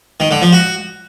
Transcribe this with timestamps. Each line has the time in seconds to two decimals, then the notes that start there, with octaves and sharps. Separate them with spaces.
0.20 D#3
0.31 D3
0.42 F3
0.53 F#4